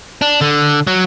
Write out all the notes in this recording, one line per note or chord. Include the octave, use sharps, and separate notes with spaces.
D4
D3
F#3